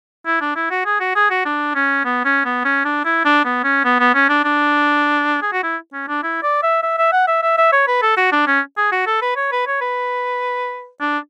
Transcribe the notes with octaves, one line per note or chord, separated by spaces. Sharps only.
E4
D4
E4
F#4
G#4
F#4
G#4
F#4
D4
C#4
B3
C#4
B3
C#4
D4
E4
D4
B3
C#4
B3
B3
C#4
D4
D4
G#4
F#4
E4
C#4
D4
E4
D5
E5
E5
E5
F#5
E5
E5
E5
C#5
B4
A4
F#4
D4
C#4
G#4
F#4
A4
B4
C#5
B4
C#5
B4
D4